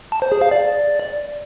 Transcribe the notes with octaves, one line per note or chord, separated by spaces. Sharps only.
A5
C5
G#4
F5
D5